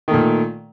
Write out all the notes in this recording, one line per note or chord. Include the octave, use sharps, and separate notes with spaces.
A#2 D#3 A3